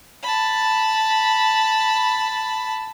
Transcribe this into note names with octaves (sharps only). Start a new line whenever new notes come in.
A5 B5